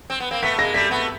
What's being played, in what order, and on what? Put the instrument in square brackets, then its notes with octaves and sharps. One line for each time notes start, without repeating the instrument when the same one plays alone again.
[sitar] C4
B3
A#3 C4
[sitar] A3 B3 [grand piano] B6
[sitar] G#3 A#3 [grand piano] A#6
[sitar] G3 A3 [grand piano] B6
[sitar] A3 B3